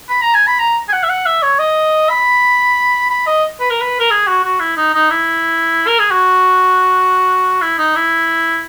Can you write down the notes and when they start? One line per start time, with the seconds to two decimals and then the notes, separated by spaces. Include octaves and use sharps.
0.09 B5
0.21 A#5
0.34 G#5
0.47 B5
0.59 A#5
0.88 G#5
0.93 F#5
1.03 E5
1.09 F#5
1.26 E5
1.42 C#5
1.59 D#5
2.09 B5
3.10 B5
3.27 D#5
3.60 B4
3.70 A#4
3.81 B4
3.99 A#4
4.10 G#4
4.27 F#4
4.44 F#4
4.60 E4
4.77 D#4
4.94 D#4
5.10 E4
5.87 A#4
5.99 G#4
6.11 F#4
7.62 E4
7.78 D#4
7.95 E4